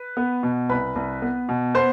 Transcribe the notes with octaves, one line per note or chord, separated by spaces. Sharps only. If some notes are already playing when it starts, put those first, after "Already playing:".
Already playing: B4
B3
B2
C2 B4 B5
C2
B3
B2
B3 C5 C6